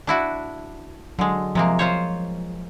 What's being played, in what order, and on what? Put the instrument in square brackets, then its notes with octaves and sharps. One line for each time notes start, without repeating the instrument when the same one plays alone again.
[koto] D4 E4 F#4
[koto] D3 G#3 [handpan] F#3
[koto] C3 G#3 A#3 [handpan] F3
[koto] F4 C5 C#5